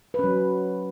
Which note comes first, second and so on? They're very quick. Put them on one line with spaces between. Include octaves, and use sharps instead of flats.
B4 C#4 F#3